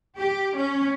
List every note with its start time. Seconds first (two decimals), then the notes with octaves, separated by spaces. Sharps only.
0.17 G4
0.55 C#4